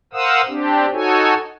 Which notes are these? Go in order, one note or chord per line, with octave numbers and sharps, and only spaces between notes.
A#4 C5 F5 F#5 D#6 E6
C4 D4 G4
D#4 F#4 A4 C#5 G#5